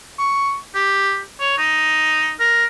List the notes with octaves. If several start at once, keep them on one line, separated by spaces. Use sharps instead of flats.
C#6
G4
C#5
D#4
A#4